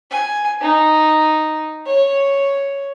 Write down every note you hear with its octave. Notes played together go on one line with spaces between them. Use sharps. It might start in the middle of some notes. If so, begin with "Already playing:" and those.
G#5
D#4
C#5